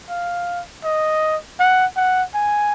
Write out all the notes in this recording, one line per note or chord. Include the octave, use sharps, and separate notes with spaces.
F5
D#5
F#5
F#5
G#5